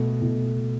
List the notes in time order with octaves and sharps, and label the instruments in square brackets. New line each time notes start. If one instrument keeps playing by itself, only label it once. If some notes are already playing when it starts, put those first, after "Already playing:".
Already playing: [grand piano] B2 A3
B2